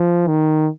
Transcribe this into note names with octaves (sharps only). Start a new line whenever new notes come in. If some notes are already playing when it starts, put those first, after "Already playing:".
Already playing: F3
D#3